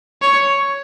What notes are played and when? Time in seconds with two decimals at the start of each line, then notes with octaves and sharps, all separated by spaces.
0.22 C#5